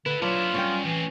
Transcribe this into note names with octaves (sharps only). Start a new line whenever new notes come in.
D3 E4 A4 B4
A#2 F#3 D4 E4 F4
F#2 G3 C#4 G5
A2 E3 C4